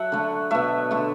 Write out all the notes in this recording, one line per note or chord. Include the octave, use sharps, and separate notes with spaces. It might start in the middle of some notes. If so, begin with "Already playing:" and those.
Already playing: F#3 A4 E5 F#5
D3 A3
B2 A3 E5
D3 A3